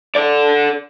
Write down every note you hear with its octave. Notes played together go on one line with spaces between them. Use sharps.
A4 D5